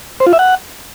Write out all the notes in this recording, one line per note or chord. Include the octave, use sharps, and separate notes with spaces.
C5
F4
E5
F#5